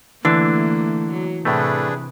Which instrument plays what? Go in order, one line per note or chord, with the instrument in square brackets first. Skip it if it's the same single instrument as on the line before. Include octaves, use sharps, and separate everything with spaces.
[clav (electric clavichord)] D3 D4 [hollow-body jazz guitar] E3 [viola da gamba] A3 A#3
[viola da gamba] F#3
[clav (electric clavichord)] A2 A3 [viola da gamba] C3 [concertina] D4 G#4 B4